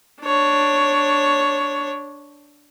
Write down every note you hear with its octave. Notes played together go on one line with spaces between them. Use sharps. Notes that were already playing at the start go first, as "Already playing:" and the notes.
D4 C#5